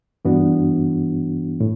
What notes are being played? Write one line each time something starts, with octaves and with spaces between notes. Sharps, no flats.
G2 E3 B3 D4 F#4
A2